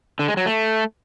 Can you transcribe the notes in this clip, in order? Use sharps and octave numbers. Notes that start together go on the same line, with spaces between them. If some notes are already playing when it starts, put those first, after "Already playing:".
D3
G#3
F#3
A3